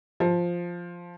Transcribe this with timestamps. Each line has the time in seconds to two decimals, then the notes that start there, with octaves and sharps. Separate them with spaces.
0.20 F3